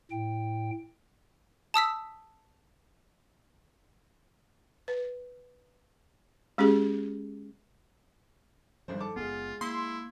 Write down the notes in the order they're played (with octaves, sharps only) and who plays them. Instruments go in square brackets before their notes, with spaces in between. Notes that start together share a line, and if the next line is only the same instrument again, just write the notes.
[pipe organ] A2 G5
[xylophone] A5 D#6 E6 B6
[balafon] B4
G#3 C#4 G4 G#4
[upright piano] G#1 G2 C5 [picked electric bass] F3
[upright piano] A4 A5 D6
[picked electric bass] F#1 E2 B3 [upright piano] G#3 G#4 [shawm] F4
[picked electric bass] A#3 [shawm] E4 [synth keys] C6